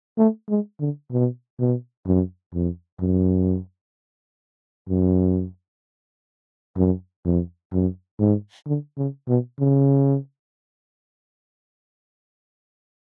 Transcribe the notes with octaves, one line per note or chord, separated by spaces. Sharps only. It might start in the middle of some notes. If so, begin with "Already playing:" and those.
A3
G#3
D3
B2
B2
F#2
F2
F#2
F#2
F#2
F2
F#2
G#2
D3
C#3
B2
C#3